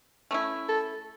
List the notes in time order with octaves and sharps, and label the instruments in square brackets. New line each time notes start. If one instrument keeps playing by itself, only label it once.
[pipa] A3 C#4 E4
[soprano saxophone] A4